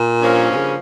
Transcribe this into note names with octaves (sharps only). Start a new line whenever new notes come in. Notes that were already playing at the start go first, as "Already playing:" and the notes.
Already playing: A#2
G2 F3 A#3 C#4
A#2
C#3